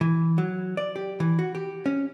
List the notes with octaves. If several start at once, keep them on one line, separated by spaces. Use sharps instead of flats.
E3
F#3
D5
G4
E3
F#4
G4
C#4